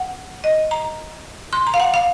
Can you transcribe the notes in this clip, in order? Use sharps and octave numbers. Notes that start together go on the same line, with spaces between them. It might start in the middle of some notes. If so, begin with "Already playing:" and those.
Already playing: F#5
D#5
A#5
C6
A#5
F5
F#5
F5